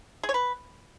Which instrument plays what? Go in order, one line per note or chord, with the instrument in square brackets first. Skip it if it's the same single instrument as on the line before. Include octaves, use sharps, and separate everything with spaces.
[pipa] G#4
C#5
B4